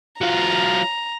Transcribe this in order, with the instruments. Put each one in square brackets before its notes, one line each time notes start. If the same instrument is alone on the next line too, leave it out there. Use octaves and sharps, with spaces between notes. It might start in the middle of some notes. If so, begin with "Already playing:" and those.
[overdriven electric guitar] F#3 F4 [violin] A#5